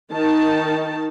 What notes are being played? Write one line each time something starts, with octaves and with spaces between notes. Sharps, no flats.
D#3 D#4 A5